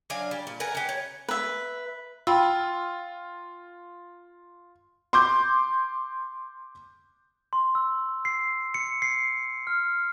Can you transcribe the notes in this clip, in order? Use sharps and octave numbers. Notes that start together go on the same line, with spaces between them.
F#3 D4 F5 G#5
G3
A#2
A#4 B4 F#5 G#5
F#4 G4
C#5
B4 E5
F4 G5 B5 E6
C6 D6 G6
C6
E6
C7
C#7
C7
F6